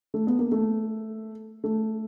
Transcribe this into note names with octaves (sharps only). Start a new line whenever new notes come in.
A3
B3
A#3
A3
A3